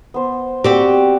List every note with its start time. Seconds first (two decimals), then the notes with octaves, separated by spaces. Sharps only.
0.14 B3 C5
0.64 G3 C4 F#4 G4 D5